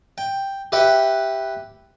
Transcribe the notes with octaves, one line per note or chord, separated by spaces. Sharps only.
G5
G4 B4 E5 F#5 G5